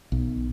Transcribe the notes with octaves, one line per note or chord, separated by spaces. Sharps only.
B1